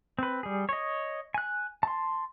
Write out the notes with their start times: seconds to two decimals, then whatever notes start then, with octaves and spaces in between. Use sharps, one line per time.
0.19 C4 B4
0.43 G3 G#4
0.69 C#5 D#5
1.34 G#5 F#6
1.83 A5 C6